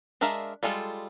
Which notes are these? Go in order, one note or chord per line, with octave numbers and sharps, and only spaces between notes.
G#3 D4 A#4 E5 F5
G3 G#3 F4 A4